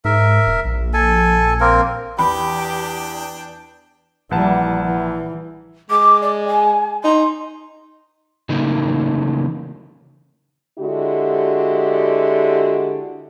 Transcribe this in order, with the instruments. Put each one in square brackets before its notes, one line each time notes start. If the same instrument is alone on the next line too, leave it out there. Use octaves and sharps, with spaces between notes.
[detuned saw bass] G#2 [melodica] A#4 E5
[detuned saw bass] E1
A#1
[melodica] A4 G#5
A#3 C4 A#4
[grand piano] E2 [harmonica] D4 G5 [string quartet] G4 [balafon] B5
[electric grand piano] A#1 B4 A5 [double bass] E3 G3 [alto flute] F#5
[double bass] E3
[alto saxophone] G#3 [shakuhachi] D6
[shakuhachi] D5
G#5
[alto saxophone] D#4 [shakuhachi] C6
[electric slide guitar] C#3 E3 F#3 A3 A#3 D#4
[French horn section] D3 G#3 E4 F#4 G4